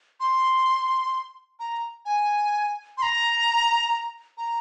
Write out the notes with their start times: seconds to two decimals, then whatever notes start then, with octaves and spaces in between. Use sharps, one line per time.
0.20 C6
1.59 A#5
2.05 G#5
2.98 C6
3.02 A#5
4.38 A#5